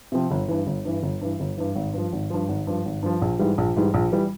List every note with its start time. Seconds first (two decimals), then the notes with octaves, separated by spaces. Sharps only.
0.12 C3 F3 C4
0.31 G1
0.48 G2 E3
0.67 G1
0.85 G2 E3
1.03 G1
1.21 G2 E3
1.40 G1
1.57 G2 E3
1.76 G#1
1.93 G2 F3
2.13 G#1
2.30 G2 F3
2.49 G#1
2.67 G2 F3
2.86 G#1
3.03 G2 F3
3.22 A#1
3.39 G#2 E3 G3
3.58 A#1
3.76 G#2 E3 G3
3.94 A#1
4.12 E3 G3